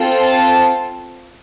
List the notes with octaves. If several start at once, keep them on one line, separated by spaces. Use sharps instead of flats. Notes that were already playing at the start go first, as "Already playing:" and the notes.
Already playing: C4 F4 A4
A5